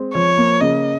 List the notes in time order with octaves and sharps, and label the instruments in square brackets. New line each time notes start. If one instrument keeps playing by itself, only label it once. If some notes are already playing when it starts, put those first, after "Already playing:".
Already playing: [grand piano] G#3 C4
[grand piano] F3 [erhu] C#5
[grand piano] A#3
[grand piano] C#3 [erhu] D#5